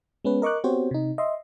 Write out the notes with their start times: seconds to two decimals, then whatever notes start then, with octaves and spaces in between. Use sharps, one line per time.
0.24 G#3 B3 C#4 B4
0.42 A#4 D#5 C#6 D6 F#6
0.64 B3 C4 F#4 G4 C5 C#5
0.91 C3 D#4
1.18 D#5 E5 C6